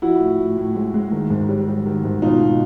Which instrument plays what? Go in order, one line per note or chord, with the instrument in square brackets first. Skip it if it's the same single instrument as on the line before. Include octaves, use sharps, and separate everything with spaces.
[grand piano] F3 E4 F#4
A2
A2
A2
G#3
G#3
D#3
G#2
G3
G3
D#3
G#2
B2 D#4 F4
B2